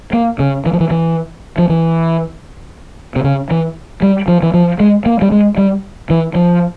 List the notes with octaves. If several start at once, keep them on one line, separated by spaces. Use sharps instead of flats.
A#3
C#3
E3
F3
E3
E3
F3
E3
C3
C#3
E3
G3
F3
E3
F3
G#3
A#3
G3
G#3
G3
E3
F3